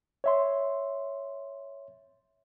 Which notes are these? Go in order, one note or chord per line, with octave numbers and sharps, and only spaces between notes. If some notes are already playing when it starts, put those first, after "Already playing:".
C#5 E5 C6